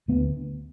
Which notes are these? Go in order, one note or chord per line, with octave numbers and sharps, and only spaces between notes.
D2 B3